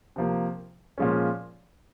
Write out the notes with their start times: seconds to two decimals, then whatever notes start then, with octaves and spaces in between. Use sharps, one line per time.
0.16 C3 F3 A#3
0.98 A#2 F3 G#3 C#4